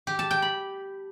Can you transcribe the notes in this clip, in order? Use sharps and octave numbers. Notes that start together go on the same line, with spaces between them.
G4
A5
G5
B5